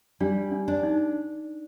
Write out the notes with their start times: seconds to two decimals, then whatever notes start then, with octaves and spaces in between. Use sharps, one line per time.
0.20 G3 D4
0.51 D4
0.68 D4
0.83 D#4